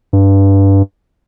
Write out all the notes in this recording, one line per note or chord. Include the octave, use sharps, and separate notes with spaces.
G2